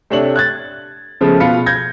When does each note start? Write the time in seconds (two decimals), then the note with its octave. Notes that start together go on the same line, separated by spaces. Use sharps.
0.10 C3 A3 D4 C#5 F#7
0.36 F#6 G#6 A6
1.21 C#3 F3 G#3 A3 B3 C#4
1.40 B2 B3 F4 F5 B5 C#7
1.66 G6 G#6 A#6